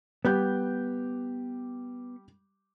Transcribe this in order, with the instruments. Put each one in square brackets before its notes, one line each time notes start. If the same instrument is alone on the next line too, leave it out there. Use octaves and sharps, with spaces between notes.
[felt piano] G3 G4 G6 [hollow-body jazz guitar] B3